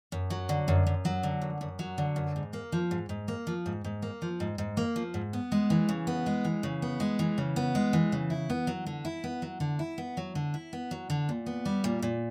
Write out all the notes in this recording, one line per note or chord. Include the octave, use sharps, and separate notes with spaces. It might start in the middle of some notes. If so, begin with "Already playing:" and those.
F#2
F#3
D3
F#2
F#2
F#3
D3
F#2
F#2
F#3
D3
F#2
G#2
A#3
F3
G#2
G#2
A#3
F3
G#2
G#2
A#3
F3
G#2
G#2
A#3
F3
G#2
B3
G#3
E3
C#3
B3
G#3
E3
C#3
B3
G#3
E3
C#3
B3
G#3
E3
C#3
E4
B3
F#3
D3
E4
B3
F#3
D3
E4
B3
F#3
D3
E4
B3
F#3
D3
A#2
B3
G3
A#2
A#2